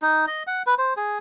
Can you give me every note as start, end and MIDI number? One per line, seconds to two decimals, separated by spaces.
0.02 0.26 63
0.27 0.43 75
0.47 0.63 78
0.66 0.75 71
0.78 0.94 72
0.97 1.18 68